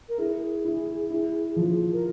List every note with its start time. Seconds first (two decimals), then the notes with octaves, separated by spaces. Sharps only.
0.09 A#4
0.18 E4 G#4
0.64 E4
1.10 E4
1.56 F3
1.92 A#4